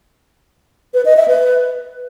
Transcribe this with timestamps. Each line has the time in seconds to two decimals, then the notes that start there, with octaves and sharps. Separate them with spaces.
0.94 B4
1.05 D#5
1.17 E5
1.28 B4